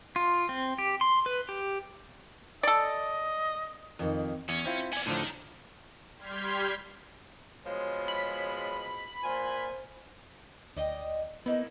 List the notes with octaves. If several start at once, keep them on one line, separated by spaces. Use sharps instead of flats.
F4
C4
G4
C6
B4
G4
A4 D5 D#5
F2 D#3
E2 C#4
C4 E4 F4
B3 C#4 D5 G#5
A2 D3 D#3 F3
G3 C6 F6 G6 G#6 B6
B2 F3 G#3 C#5
B5
A#2 F4 C5 G#5
D2 D5 D#5 G5
A#3 B3 D#4 E4